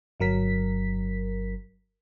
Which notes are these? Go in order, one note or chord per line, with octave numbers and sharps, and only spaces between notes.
G1 F#3 A#4 B6